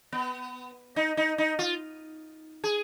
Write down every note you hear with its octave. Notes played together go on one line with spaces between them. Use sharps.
B3
D#4
D#4
D#4
F4
G#4